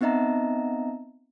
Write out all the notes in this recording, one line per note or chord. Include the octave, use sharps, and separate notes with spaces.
B3 C4 D#4 D#5 E5 A#5